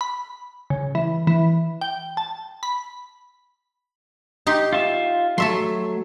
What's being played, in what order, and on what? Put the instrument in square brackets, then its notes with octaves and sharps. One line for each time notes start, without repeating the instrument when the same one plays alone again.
[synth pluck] B5
C#3
E3
E3
G5
A5
B5
[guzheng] D#4 G4 C6
[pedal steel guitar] F4 E5
[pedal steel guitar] F#3 A3 [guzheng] A4 E5 C6